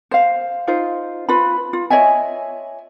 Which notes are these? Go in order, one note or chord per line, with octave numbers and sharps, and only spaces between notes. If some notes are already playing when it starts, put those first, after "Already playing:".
C5 F5
D#4 F4 C5
F4 B4 B5
F4
C#5 D#5 E5 G#5